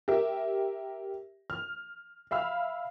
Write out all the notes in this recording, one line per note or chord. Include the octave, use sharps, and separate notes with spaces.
G4 A#4 E5
F6
E5 F5 B5 E6 F6